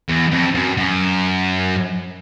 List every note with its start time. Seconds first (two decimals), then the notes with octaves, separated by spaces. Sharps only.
0.08 E2
0.31 F2
0.55 F#2
0.77 F#2